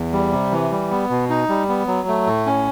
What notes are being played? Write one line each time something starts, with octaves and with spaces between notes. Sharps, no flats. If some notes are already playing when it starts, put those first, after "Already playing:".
Already playing: E2
G3
C3
E3
G3
B3
B2
D#4
G3
B3
F#3
A3
A2
C#4